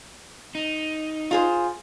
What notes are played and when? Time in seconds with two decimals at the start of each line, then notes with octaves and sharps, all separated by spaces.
0.55 D#4
1.31 F4 G#4 C5